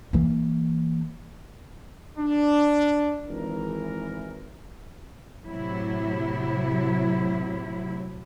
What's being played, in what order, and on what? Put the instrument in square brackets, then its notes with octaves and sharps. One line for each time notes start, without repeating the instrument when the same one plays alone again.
[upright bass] E3 A#3
[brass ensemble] D4
G#1 E3 A#4
[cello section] A2 C3 F#3 E4